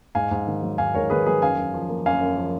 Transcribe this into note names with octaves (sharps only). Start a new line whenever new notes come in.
G#2 F5 G#5
G#2
D#3
F#3
G#2 F5 G#5
G#2 A#4 C#5
D#3 G#4 B4
F#3 G#4 B4
F#2 F5 G#5
F#2
F3
A#3
F#2 F5 G#5
F#2
F3